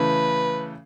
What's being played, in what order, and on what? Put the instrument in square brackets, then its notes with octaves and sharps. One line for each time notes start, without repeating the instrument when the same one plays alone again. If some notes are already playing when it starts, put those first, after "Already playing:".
Already playing: [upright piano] C#3 E3 A3 [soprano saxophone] B4